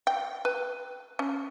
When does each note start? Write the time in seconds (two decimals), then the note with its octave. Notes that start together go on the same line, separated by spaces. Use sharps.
0.07 G5
0.45 B4
1.19 C#4